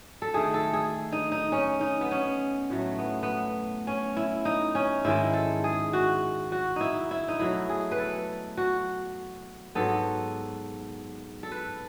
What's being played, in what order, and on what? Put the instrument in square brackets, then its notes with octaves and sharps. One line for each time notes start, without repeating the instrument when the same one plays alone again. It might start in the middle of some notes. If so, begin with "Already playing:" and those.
[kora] A4
D#3 A3 G#4
A4
G#4
D#4
D#4
C#4
D#4
B3
C#4
A2 F#3 A3
B3
B3
C#4
E4
D#4
C#4
G#2 D#3 G#3 E4
A4
G#4
F#4
F#4
D#4 E4
E4
D#4
B2 F#3 A3 E4
G#4
B4
A4
F#4
G#2 F#3 B3 A4
A4
B4